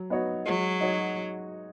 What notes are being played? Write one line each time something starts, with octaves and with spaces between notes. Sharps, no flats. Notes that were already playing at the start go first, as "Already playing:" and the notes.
Already playing: F#3
B3 D#4 F#4 C#5
F#3 G#3
D#4 F#4 C#5